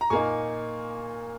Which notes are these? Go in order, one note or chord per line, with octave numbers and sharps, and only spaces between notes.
A#5
A#2 A#3 D#4 G#5 C#6